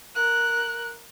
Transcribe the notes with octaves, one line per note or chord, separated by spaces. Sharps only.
A#4 F#6